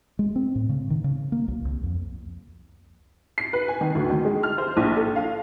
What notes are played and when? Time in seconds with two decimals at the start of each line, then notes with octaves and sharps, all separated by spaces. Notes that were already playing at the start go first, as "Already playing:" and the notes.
0.19 G#3
0.36 C4
0.55 A2
0.69 C#3
0.90 D#3
1.04 C#3
1.32 A#3
1.48 B1
1.65 C2
1.83 F2
3.38 C7
3.53 B4
3.68 G#5
3.81 D#3
3.95 D2
4.10 D#3
4.25 G#3
4.43 F6
4.58 C5
4.77 A#1
4.96 A4
5.16 F5